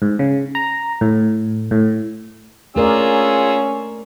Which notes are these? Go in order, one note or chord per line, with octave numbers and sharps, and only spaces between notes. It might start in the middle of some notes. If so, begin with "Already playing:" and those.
G#2
C#3
A#5
A2
A2
A3 C#4 F4 G#4 A#4 D5 E6